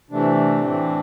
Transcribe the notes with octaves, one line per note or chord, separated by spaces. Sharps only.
C3 E3 A3 D4
A2 E3 A3 C4